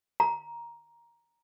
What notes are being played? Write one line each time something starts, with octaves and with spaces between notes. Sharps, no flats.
A#5